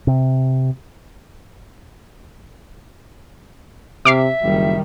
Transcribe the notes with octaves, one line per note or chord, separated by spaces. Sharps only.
C3
C3 E5 D6 F6 C7
F#1 D#3 G3